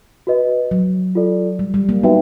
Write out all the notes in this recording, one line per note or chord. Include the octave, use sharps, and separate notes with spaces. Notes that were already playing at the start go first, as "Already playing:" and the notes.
F#4 B4 D#5
F#3
F4 A4 D5
G3
G3
A#3
B3 D#4 F#4 B4 E5 G5